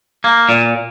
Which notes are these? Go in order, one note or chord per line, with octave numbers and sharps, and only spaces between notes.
A#3
A#2